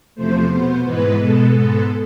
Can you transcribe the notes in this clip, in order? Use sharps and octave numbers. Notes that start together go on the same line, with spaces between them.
E2 C3 F3 A3 C5
B2 B3
G#2 E3 G#3 B3 B4
B2 G#3 B3 A4
G#2 G#3 B3 A4